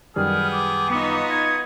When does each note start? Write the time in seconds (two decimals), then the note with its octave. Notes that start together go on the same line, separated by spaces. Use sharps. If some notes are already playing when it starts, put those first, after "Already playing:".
0.16 F#2 D#3 G3 B3 G#4 G5 F6
0.52 D6
0.90 B3 D#4 F4 C#6 D#6
1.30 G#6